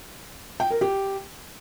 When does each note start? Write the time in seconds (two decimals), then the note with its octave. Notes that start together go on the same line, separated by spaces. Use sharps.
0.60 G5
0.71 A#4
0.81 G4